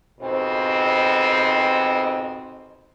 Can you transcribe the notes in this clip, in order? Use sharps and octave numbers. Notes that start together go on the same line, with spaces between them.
F2 G#2 B2 C4